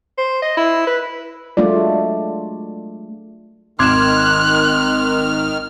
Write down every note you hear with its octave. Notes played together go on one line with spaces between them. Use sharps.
C5
D#5
E4
B4
F#3 G#3 A3 D4 F4 D5
G#1 D#3 C6 D6 F6 F#6 G#6 E7